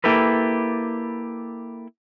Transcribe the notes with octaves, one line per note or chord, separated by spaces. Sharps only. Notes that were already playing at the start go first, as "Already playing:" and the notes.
A#3 E4 G4 A4 B4